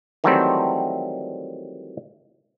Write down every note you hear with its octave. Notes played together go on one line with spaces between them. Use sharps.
D#3 E3 F#3 G3 A3 C4